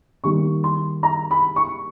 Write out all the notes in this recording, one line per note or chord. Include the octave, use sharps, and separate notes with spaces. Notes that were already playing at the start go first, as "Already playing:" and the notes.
D#3 G3 A#3 C#6
C6
A#5
B5
C#6